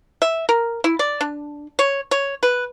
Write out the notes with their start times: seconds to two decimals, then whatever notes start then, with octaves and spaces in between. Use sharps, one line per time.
0.22 E5
0.49 A#4
0.84 E4
0.99 D5
1.21 D4
1.79 C#5
2.11 C#5
2.43 B4